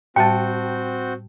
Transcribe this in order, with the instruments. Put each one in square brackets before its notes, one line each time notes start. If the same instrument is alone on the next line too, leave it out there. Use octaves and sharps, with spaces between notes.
[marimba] A2 G3 A6 [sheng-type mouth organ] C4 F#4 G6 [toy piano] G5 A5